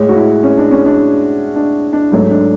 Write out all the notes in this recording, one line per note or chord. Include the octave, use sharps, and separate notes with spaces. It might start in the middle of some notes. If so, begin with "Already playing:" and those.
Already playing: A2 G#3 C#5
F#4
E4
C#4
D4
C#4
D4
D4
D4
G#2 F#3 A3
D4